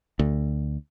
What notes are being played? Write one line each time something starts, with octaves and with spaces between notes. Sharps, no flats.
D2